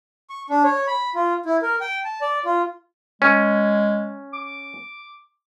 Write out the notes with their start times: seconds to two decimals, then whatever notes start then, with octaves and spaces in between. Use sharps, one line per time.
0.30 C#6
0.50 D4
0.64 C#5
0.87 B5
1.15 F4
1.46 E4
1.62 A#4
1.81 G5
2.05 A5
2.21 D5
2.45 F4
3.22 G#3 C#4
4.33 D6